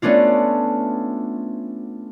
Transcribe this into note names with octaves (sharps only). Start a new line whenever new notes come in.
A3 B3 C#4 D4 F4